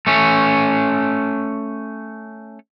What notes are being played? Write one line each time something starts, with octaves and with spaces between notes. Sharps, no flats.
A3 C#4